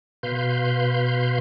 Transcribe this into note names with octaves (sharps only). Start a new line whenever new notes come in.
B2 B4 F5 C6 G6